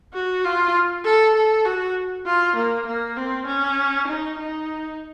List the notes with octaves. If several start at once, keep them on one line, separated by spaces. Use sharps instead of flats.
F#4
F4
A4
A4
F#4
F4
A#3
A#3
C4
C#4
D#4
D#4